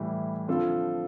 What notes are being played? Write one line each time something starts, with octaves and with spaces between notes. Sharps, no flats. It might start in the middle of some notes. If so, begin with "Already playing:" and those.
Already playing: A2 E3 G3
D3 F3 C4 F4 A4